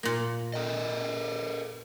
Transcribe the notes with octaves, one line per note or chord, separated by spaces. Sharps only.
A#2 A#3
A4 A#4 D#5